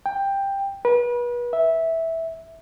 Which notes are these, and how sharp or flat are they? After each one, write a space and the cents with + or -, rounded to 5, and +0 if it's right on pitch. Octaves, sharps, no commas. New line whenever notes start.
G5 +10
B4 -35
E5 -10